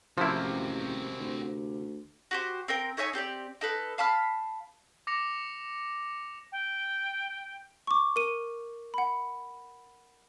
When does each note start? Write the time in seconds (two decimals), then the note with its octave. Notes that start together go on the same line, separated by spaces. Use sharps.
0.18 A1 C3 F3 A#3 C4 E4 F#4
1.20 D2
2.31 F#4 G4 C5
2.68 C4 A#4 G5
2.97 D#4 C#5 E5 G#5
3.13 C4 G4 A4 D5
3.61 D#4 A4 B4
3.98 F5 A5 B5 F6
5.07 D6 A#6 C#7 F7
6.52 G5
7.87 C#6 D6
8.16 A#4 D#7
8.94 F#5 B5